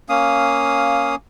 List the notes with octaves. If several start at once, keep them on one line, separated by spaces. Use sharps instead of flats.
A#3 C#4 F5 D#6